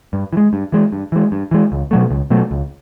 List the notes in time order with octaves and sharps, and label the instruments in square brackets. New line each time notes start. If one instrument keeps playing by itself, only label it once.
[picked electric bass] G2
E3
G#3
G2
E3 G#3
G2
E3 G#3
G2
E3 G#3
C#2
B2 F#3 A3
C#2
B2 F#3 A3
C#2